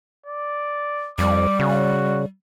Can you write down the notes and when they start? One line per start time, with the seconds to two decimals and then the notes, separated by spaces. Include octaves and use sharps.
0.26 D5
1.18 F2 G3 D6
1.59 C#3 F#4